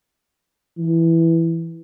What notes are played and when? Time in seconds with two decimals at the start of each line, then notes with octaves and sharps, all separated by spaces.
0.78 E3